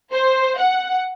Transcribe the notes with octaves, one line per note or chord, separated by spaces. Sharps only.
C5
F#5